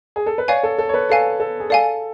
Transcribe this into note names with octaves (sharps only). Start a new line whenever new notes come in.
G#4
A4
B4
C#5 D5 F5 G#5
A4
A4
C#5
B4
A4 D5 F5 G#5
A4
G#4
A4 D5 F5 G#5